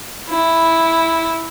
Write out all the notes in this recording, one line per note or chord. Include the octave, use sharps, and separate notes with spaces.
E4